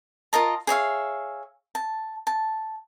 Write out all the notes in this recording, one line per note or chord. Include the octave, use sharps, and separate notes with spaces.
F4 A#4 D#5 A5
G#4 C#5 E5 F5
A5
A5